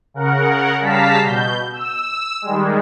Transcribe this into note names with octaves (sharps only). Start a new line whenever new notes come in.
C#3 A#4 F#5
C#3 G3 F5 A5 A#5 B6
B2 G6
E6
D#3 G3 G#3